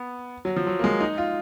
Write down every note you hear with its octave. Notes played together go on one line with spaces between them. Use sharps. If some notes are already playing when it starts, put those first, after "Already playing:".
Already playing: B3
F#3
F3
F#3
A#3
G#3
D#4
F4